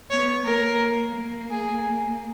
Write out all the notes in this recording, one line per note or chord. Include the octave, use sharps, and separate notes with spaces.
B3 C#5
A#3 A#4
A#3
G#4